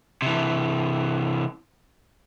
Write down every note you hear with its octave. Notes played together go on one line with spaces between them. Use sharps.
C3 E3